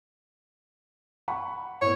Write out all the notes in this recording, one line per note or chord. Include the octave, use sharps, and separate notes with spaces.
F#5 B5 C#6
A2 B3 C#5